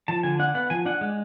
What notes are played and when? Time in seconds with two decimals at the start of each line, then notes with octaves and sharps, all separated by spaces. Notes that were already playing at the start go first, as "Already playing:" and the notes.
0.08 F3 A5
0.23 D3 G#5
0.39 D4 F#5
0.54 B3 F#5
0.70 F3 G#5
0.86 D4 F#5
1.01 G#3